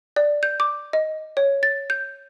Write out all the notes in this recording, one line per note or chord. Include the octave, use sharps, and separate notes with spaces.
D5
G6
D6
D#5
C#5
A6
G6